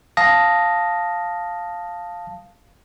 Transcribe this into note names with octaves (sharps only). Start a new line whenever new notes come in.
F5 A5 D#6 A#6